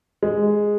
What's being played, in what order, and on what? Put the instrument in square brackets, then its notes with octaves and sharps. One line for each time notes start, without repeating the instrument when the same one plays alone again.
[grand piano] G#3